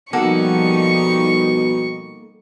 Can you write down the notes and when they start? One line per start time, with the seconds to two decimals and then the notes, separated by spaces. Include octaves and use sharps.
0.13 B2 F3 G3 A#3 D#4 A4 F#5 C#6